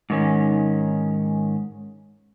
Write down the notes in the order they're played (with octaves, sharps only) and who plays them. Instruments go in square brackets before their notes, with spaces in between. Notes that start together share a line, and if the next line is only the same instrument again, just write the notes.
[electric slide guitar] G#2 D#3 C#4